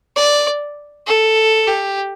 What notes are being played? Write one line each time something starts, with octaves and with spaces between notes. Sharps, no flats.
D5
A4
G4